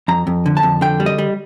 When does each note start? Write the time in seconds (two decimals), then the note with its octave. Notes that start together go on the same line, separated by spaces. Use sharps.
0.08 F2 A#5
0.27 F2
0.46 D3
0.57 A5
0.63 F2
0.81 D3 G5
1.00 G3
1.06 D#5
1.18 G3